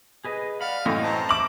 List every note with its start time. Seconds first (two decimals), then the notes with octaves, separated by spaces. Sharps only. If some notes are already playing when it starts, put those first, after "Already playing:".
0.25 G#4 B4 D#5
0.61 D5 F5 F#5 B5
0.86 F#2 A2 E3 D#5 G5
1.03 C5 A5 A#5
1.29 E5 D6 F#7